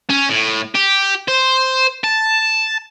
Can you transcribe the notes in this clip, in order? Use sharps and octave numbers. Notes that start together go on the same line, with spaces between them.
C#4
A2
G4
C5
A5